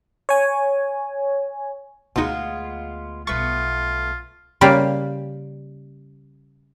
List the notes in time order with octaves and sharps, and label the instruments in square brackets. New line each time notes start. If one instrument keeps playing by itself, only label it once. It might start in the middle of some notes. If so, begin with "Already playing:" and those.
[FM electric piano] C#5 G#5
[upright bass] D2 [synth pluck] B2 D#4 [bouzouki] G#3 B3 F4
[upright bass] B1 G3 [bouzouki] A3 B3 [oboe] F4 [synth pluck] C#6 A6
[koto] C#3 G3 A#3 G4 D5 F5